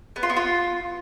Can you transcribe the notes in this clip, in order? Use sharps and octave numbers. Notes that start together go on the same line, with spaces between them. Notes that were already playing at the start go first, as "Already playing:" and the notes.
B3
F4
B3
F4